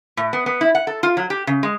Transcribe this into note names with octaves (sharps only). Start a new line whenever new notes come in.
A2
B3
B3
E4
F#5
A4
F4
F#3
G4
C#3
G#3